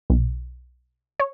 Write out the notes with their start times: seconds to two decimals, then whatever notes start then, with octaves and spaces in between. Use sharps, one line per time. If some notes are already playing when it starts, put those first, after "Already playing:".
0.10 B1
1.20 C#5